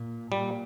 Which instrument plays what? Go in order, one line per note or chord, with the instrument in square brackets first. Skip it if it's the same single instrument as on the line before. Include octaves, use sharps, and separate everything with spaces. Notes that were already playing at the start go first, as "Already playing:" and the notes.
Already playing: [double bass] A#2
[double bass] A#2 [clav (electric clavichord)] G3